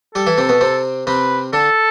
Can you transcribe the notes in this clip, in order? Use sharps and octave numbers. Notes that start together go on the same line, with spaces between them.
G3 G4 A4
E3 E4
C3 C4
B2 B3
C3 C4
C3 C4 B4
D3 D4 A4